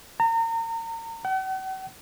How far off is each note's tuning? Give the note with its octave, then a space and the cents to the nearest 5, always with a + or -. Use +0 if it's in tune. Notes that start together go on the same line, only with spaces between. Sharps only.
A#5 -35
F#5 +45